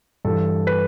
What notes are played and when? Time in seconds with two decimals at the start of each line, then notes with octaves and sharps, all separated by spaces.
0.25 G2 E3 A4
0.67 B4